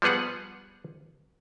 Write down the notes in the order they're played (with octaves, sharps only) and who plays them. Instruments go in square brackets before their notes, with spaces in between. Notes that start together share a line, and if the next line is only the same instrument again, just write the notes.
[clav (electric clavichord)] F3 G3 B3 G#4 F#5